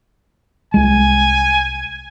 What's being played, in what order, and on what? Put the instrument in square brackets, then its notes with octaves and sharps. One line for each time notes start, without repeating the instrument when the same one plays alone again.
[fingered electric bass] C2 G#3 [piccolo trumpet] G#5